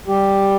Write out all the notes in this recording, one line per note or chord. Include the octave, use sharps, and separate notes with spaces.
G3 G4